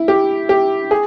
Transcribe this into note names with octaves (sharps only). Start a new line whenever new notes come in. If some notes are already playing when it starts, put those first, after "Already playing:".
Already playing: E4
G4
G4
G#4